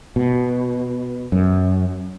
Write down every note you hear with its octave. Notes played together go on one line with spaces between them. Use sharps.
B2
F#2